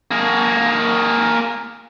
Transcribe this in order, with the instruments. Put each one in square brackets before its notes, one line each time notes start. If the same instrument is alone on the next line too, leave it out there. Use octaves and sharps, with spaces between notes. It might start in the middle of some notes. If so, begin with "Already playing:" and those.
[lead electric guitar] A#3 G#4